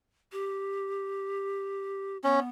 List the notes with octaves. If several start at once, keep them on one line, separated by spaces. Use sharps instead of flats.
G4
B3 C#4